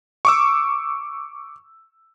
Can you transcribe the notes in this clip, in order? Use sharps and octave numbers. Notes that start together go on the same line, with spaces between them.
C#6 D6 E6